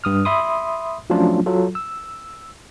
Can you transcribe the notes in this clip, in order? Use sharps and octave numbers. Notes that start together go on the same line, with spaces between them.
G2 D#6 F6
E5 B5 C6 D#6
F3 F#3 A3 C#4 D4 F4
F#3 F4 A4
E6